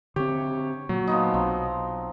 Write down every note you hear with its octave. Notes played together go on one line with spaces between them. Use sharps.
D3 C4 G4 C#5
A#2 F#3
F3 B3 D#4
B1 C4